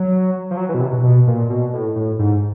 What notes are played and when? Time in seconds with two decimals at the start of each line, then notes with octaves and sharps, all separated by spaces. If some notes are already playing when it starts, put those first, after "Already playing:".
Already playing: F#3
0.51 F3
0.57 F#3
0.69 E3
0.74 B2
0.81 C3
0.92 B2
1.03 B2
1.27 A#2
1.50 B2
1.73 A2
1.96 A2
2.19 G#2